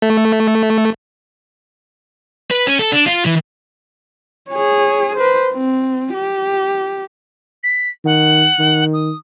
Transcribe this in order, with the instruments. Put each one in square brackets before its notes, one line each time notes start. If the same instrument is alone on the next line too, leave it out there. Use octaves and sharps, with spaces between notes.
[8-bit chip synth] A3
[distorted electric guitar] B4
C#4
A4
D4
F4
E3
[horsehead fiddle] G#4 C#5
B4 C5
C4
G4
[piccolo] B6
[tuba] D#3 [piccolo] F#5
[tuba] D#3
[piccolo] D#6